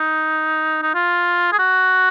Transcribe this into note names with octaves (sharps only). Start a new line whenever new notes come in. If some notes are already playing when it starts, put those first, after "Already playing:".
Already playing: D#4
D#4
F4
G#4
F#4